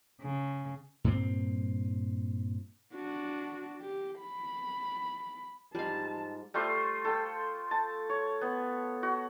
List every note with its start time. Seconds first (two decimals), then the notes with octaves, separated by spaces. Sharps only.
0.21 C#3
1.04 G2 A#2 C4
2.94 D4 F#4
3.81 G4
4.20 B5
5.75 G#2 G3 F4 D#5 F5 A5
6.54 G3 A3 F4 C5
7.05 A4 G5
7.71 A5
8.09 C#5
8.41 B3
9.03 F#4